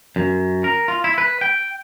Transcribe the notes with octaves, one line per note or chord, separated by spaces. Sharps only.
F#2
A#4
F4
E4
B4
G5